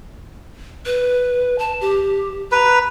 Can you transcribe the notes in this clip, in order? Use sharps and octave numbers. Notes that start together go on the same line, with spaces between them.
B4
A5
G4
B4 A#5